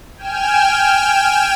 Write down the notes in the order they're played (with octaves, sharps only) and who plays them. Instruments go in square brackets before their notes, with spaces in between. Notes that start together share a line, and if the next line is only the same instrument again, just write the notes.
[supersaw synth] G5 G#5 F6 E7